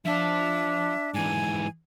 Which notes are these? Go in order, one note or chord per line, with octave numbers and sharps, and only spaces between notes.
F3 D4 E5 A5
G#2 E3 G#5